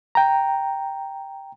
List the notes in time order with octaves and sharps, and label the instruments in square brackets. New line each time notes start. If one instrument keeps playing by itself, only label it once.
[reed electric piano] G5 A#5